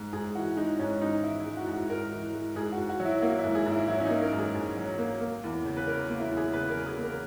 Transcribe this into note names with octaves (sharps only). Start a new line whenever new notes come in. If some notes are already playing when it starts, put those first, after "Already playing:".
Already playing: G#2
G#2 G#4
E3 F#4
G#3 D#4
G#2 C#4
G#2 D#4
E3 E4
E4
G#3
F#4
G#2
F#4
G#2 A#4
E3
G#3
G#2 G#4
F#4
G#2
F#4
F#3
E4
A#3 F#4
E4
G#2
G#4
G#2
E4
F#3 E4
C#4
D#4
A#3
A#4
G#2
G#4
G#2
F#3
A#3
A#3
E2
C#3
B4
F#3 A#4
A#3
E4
E2
G#4
C#3 B4
A#4
F#3
G#4
A#3 A#4